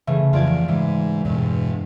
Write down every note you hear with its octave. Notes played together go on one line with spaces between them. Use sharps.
C#3 E3 A3
F2 E3 F3 F4 D5 G#6
G#2 E3 G#3
E2 G2 B2 G#3